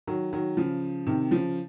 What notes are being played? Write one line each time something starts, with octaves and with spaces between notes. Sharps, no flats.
D#3 F#3
D#3 F#3
C#3 F3
C3 D#3
C#3 F3